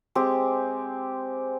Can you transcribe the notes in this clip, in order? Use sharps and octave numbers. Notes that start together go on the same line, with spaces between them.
G#3 C4 G4